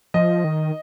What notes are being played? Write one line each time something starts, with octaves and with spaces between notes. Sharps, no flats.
F3 D#5
D#3